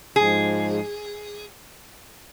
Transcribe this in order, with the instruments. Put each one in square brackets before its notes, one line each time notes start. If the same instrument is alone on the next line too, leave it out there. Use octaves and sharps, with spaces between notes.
[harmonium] G#2 F3 G#3 [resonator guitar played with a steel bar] G#4